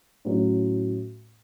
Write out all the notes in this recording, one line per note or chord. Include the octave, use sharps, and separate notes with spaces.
A2 F#3 C#4